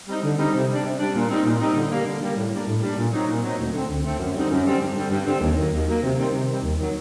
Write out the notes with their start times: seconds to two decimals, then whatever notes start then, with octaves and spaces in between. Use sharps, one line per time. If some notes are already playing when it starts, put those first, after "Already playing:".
0.08 G3 C4 D#4
0.23 D3
0.38 G3 C4 D#4
0.54 C3
0.69 G3
0.74 D4
0.84 C3
0.99 G3 D4
1.15 A#2
1.30 G3 C4 D#4
1.46 A#2
1.60 G3 C4 D#4
1.76 D3
1.91 G3 A#3
2.06 D3
2.22 G3 A#3
2.36 A2
2.52 G3 A#3 D4
2.67 A2
2.83 G3 A#3 D4
2.98 A#2
3.13 F#3 C4 D#4
3.28 A#2
3.43 F#3 C4 D#4
3.58 D2
3.74 D3 A3 C4
3.89 D2
4.04 D3 A3 C4
4.19 F#2
4.35 D3 G3 C4 D#4
4.50 F#2
4.65 D3 G3 C4 D#4
4.80 G2
4.95 D3 G3 C4
5.11 G2
5.26 D3 G3 C4
5.41 D#2
5.57 D#3 F#3 A#3
5.72 D#2
5.87 D#3 F#3 A#3
6.02 C3
6.18 D#3 G3 C4
6.33 C3
6.48 D#3 G3 C4
6.63 D#2
6.78 D#3 F#3